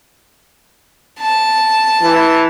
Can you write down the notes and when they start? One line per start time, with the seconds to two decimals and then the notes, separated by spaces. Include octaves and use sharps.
1.19 A5
2.02 E3